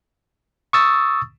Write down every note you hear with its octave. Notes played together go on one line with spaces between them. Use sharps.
C#6 D#6 E6 A6